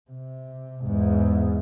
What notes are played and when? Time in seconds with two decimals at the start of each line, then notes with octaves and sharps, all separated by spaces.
0.11 C3
0.85 E2 G#2